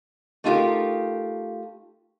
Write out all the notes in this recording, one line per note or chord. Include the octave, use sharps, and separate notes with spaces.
A3 D#4 F4 G4 A#4